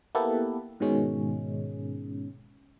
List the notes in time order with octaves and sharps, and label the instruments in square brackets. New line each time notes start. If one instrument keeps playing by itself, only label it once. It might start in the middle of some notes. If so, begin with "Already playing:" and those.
[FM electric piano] A#3 B3 E4 G4 A4 B4
G#2 B2 D#3 G#3 C#4